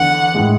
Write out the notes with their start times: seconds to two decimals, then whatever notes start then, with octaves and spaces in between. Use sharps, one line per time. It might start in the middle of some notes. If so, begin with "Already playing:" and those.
Already playing: E2 D3 F#5
0.34 A2 E3 G#3